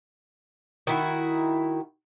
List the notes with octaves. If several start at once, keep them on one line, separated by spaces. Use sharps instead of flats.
D#3 E4 F#4